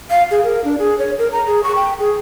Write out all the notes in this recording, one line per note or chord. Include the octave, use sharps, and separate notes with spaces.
F5
G#4
A#4
D4
G#4
C#5
A#4
A#5
G#4
C#6
G5
G#4